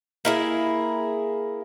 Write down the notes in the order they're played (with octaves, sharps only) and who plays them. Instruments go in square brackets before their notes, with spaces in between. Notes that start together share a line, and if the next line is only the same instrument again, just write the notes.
[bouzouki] A#3 E4 G#4